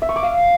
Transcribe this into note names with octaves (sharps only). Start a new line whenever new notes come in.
E5
C#6
D6
F5